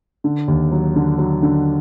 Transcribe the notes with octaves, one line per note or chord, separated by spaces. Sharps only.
D3
D#2
F#3
D3
F#3
D3